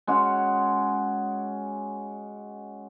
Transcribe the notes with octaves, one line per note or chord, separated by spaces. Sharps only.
G#3 C#4 F#4